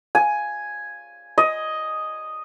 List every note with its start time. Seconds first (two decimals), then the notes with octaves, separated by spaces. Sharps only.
0.15 G#5
1.38 D#5